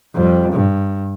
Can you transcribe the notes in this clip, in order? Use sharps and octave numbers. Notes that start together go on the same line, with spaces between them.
F2 G3
G2